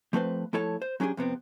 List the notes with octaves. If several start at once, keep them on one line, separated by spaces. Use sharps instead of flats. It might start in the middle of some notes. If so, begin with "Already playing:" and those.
F3 A3 C4 B4 C5
F3 A3 E4 A4 C#5 A5
C5
F#3 C#4 D4 G4 G#4
F2 C3 B3 C4